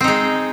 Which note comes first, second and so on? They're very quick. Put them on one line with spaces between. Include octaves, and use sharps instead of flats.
C4 D#4 G#3